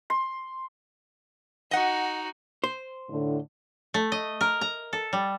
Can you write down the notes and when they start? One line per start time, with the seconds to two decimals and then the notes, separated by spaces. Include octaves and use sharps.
0.10 C6
1.71 D#4 F#4 D#5 F#5
2.64 C5
3.09 A2 D3
3.94 A3
4.12 D#5
4.41 A#4
4.61 A#5
4.93 A4
5.13 G3